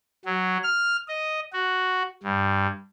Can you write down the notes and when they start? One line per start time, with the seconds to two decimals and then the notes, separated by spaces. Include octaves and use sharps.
0.25 F#3
0.63 F6
1.08 D#5
1.53 F#4
2.23 G2